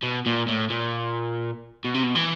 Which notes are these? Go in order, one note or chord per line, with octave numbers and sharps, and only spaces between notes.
B2
A#2
A2
A#2
B2
C3
B2
E3